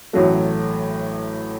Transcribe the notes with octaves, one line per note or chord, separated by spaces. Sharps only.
A1 A2 F#3 A3 F#4